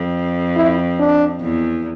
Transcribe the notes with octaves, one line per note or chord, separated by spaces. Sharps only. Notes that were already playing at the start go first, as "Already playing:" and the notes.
Already playing: F2
E4
D4
E2